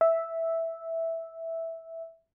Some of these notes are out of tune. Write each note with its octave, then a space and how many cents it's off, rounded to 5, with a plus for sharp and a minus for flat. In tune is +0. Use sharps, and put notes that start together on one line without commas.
E5 -5